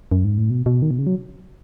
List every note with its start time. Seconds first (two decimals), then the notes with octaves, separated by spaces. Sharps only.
0.12 F#2
0.24 G#2
0.38 A2
0.50 B2
0.66 B2
0.82 D#3
0.91 B2
0.99 C#3
1.07 F#3